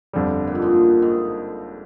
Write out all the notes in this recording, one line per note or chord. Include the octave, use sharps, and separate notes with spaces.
G1 F2 D3 G3
A#2
G#2
A#2
G#2